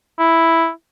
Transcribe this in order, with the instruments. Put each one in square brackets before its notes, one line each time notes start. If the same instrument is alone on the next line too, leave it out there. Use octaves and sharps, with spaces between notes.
[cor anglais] E4